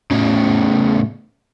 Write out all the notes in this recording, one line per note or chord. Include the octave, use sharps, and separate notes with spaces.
A2 C#3